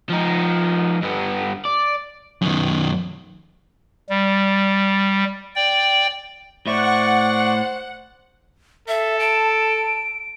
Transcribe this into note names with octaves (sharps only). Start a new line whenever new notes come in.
F3 D#4
G2 B3
D5
F#2 D#3
G3
D5 G5
A2 C5 D5 E5 F#5 C#6
A4 E5
A5 D7